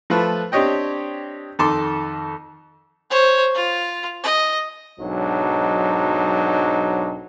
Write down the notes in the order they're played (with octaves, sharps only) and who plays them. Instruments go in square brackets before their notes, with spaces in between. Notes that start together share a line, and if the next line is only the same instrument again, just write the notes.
[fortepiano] F3 A3 F4 B4
C4 D4 G4 C#5 D#5 G5
F2 D#3 A4 A5 C6 D6
[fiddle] C5 C#5
F4
D#5
[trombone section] B1 G#2 F#3 D4 D#4